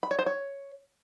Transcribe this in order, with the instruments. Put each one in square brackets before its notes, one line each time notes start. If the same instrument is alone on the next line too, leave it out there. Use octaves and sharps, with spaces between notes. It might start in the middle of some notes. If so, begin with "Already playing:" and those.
[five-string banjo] B5
C#5
C5
C#5